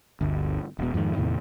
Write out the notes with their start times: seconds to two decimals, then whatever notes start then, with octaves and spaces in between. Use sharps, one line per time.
0.21 G1 D2
0.79 E1 B2
0.94 F2 G#2 D3 D#3
1.16 E2 A2 C3 D#3